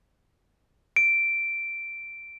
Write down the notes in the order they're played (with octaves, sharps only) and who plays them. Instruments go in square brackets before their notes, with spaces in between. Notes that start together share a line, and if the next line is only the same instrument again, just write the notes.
[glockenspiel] D7